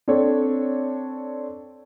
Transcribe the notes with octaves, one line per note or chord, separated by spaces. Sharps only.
C4 D4 A4 C#5